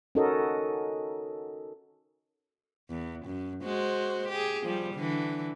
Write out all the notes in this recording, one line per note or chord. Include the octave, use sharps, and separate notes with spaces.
C#4 D#4 F#4 A4 A#4 D#5
E2
F#2
G#3 F#4 C5
G4 G#4
F3 G3
D3 E3